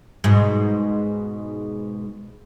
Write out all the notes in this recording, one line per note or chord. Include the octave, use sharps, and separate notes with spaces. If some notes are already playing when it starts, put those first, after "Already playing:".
G#2 B2